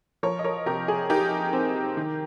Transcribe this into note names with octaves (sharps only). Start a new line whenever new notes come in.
F3 A#4 C#5
D#5
A#4 C#5
C3 G4 A#4
G#4
D#4 G4 A#4
C4
D#3